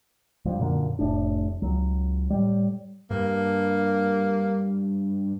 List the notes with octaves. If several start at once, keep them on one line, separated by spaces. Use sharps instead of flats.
G2 F3
F#2 A#2 D3 A#3
F1 A2 D4
C#2 F#3
A2 G3
G2 A#3